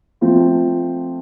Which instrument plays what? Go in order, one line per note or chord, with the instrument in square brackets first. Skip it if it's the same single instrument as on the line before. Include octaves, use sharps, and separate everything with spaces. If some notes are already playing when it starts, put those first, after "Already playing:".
[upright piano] F3 A3 C4 F4